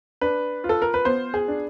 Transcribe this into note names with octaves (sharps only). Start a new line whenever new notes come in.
D4 B4
F4
A4
A#4
B4
B3 C5
G#4
D4